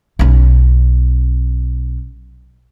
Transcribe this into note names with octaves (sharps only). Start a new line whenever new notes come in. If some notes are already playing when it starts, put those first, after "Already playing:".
B1 C#4